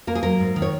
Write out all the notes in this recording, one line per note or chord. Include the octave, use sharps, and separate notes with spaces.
A#3 A#4
G#4
F#3 A#4
G#2
D#3
C#5